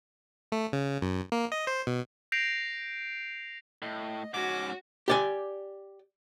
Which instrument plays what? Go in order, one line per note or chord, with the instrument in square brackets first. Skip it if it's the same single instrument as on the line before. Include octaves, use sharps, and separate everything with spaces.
[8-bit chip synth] A3
C#3
F#2
A#3
D#5
C5
B2
[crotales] G6 A#6 C7 D7 F7
[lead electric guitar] A2 [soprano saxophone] D#5
[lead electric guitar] G#2 C#4 [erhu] F#4 [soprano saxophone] D6
[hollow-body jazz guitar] G4 D5 G#5